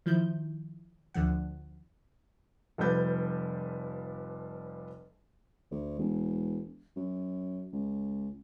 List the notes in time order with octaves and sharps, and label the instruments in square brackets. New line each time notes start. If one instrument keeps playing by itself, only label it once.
[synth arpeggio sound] D#3 F3 E4 G6
D2 D3 F3 F#5
[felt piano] F1 F3 G3 B4 G6 A6
[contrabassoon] D2
E1
F#2
C#2